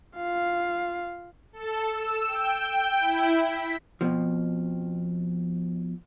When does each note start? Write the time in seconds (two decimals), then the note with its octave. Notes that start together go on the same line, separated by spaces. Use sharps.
0.16 F4 F5
1.53 A4
1.87 E6
2.28 G5
2.72 G5
3.00 E4
3.46 B6
4.01 F2 B2 F3